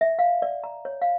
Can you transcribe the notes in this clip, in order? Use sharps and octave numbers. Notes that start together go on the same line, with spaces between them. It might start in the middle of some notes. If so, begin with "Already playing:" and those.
E5
F5
D5
A#5
C#5
F5